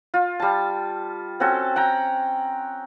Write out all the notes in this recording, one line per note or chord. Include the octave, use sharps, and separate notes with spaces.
F4
G3 A5
C4 C#4 F#4 A4
F#5 G5 A#5